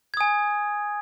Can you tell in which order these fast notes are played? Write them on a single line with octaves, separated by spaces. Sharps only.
G#6 D#6 G#5